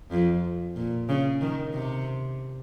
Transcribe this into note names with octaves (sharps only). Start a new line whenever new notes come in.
F2
A#2
C#3
D#3
C3